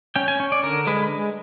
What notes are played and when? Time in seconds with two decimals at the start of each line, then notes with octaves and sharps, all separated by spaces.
0.16 C#4 G5
0.28 G#5
0.40 C#4
0.52 D5
0.63 D3 A#4
0.87 G#3 B4